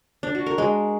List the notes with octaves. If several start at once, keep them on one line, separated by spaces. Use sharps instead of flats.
D4
F#4
A#4
G#3